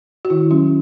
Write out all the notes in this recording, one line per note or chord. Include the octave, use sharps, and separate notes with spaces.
F#4
D#3 E4
F#3 C#4